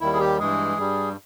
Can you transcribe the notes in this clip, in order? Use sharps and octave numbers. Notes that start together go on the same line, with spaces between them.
D#2 D#3 G3 E4
G#4
G4
G2 E3 G#3 G#4
G2 G3